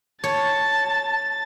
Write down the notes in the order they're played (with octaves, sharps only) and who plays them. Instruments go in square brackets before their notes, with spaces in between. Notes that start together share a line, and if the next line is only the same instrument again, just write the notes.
[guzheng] C#5 [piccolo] A5 [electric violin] A6